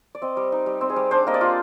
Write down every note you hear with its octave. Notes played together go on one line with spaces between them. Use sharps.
D5
C4 D#5
G3
D#4
G3
C4
G#4
G3
D4 C5
A#3 D#5
D5
F4